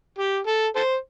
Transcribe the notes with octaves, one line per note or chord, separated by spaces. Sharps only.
G4
A4
A4 C5